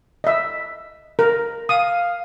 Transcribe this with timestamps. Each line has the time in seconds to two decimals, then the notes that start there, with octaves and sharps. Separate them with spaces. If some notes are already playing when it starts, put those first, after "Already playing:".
0.24 D#5 E5
1.19 A#4
1.69 F5 D#6